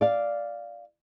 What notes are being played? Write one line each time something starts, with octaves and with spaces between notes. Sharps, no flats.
D5 F5